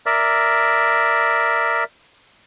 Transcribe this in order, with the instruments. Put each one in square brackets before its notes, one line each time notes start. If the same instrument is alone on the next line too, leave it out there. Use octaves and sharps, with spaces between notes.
[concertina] A#4 D5 E5